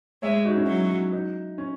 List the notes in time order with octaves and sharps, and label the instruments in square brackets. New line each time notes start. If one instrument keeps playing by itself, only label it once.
[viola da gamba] G#3 [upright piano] C#5 E5
[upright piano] D#4 F#4
C#4 E4
[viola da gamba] F#3
[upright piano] D#4
C#4